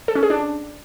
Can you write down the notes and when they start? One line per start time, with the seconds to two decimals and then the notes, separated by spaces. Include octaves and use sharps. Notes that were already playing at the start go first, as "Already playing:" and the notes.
0.08 A4
0.15 C#4
0.23 G#4
0.30 D4